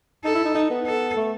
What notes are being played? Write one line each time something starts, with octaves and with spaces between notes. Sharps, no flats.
D#4 A4
E4
D#4
D#4
B3
A4
A3